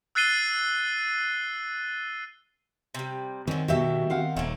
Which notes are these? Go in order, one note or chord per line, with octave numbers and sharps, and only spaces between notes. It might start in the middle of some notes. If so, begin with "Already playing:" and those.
E6 F#6 A6 C7 D#7 G7
C3 G3
D3 D#3 C4 C#4
B2 F#3 F#4 G4 E5
C4 F5 F#5
D#1 A3 A#3